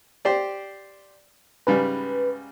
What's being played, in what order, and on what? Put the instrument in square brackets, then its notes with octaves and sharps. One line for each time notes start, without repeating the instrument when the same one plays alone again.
[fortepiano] G4 C5 D5
[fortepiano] G#2 C#3 G3 [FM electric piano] B4